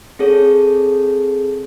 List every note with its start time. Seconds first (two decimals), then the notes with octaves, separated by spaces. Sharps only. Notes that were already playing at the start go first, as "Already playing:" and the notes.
0.19 C4 G#4 A4 C#5